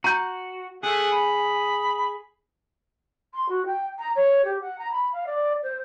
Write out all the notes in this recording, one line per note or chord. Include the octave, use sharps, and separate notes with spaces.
F#4 A#5 G6
A3 G#4 F#5 G#5
B5
C6
F#4
G5
A#5
C#5
G4
F#5
A#5
B5
F5
D5
C5